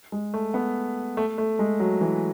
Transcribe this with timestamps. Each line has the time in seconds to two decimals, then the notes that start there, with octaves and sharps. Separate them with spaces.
0.12 G#3
0.34 A3
0.54 B3
1.17 A3
1.38 A3
1.59 G#3
1.80 F#3
2.01 E3